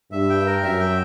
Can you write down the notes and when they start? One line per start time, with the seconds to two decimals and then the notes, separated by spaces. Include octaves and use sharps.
0.12 G2 E5
0.30 G5
0.46 A#4
0.63 F#2 E5
0.80 G5